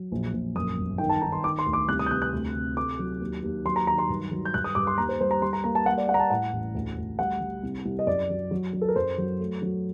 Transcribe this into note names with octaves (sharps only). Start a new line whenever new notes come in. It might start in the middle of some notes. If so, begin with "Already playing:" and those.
Already playing: F#3
A#1
A#1
F#2 D#6
G1
D#3 G5
A5
D#3 A#5
C6
D#3 D6
C6
D2
D6
C2 F#6
D#6
G6
C3 F#6
F#6
D2
C3
A3 D6
F#3
D#2
D#2
F#3 C6
A#5
D#3 A#5
C6
G2
F#3
G6
G2 F#6
D#6
G2 D6
C6
D#2 A#5
C5
G3 C5
A#5
G3 C6
A#5
A#3 A#5
A5
G3 F#5
D5
A#3 F#5
A#5
A5
A2 F#5
A1
D2
D2
G3 F#5
G3
C2
C2
D#5
F#2 D5
F#3
F#3
F#3
A4
A#4
F#2 C5
F#3
A3
F#3